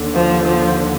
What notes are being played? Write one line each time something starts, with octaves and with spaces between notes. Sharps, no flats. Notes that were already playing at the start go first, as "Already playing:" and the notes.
Already playing: D#2 D3
F3
F3